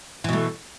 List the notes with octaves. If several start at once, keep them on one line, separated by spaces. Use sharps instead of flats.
B2 E3 A3